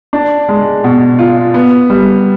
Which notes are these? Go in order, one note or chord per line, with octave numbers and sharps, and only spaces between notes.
D4
G#3
B2
F4
B3
G3